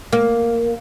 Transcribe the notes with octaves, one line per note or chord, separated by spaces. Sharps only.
A#3